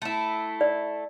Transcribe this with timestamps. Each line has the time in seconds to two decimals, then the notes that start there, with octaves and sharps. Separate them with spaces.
0.02 A3 E4
0.61 D5